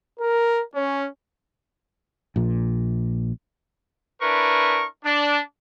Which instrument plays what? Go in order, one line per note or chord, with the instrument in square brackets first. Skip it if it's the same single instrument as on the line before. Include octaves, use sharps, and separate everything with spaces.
[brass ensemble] A#4
C#4
[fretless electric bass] A#1 A#2
[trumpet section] D4 E4 A#4 B4 C#6
D4